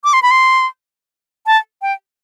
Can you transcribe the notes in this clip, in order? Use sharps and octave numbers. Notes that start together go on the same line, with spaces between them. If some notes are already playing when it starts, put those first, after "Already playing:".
D6
C6
B5
C6
A5
G5